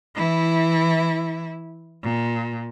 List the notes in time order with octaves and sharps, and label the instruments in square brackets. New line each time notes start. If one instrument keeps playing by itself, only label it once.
[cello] E3 E4
A#2